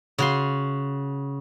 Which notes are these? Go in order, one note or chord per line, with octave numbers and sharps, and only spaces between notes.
C#3 F#4 C6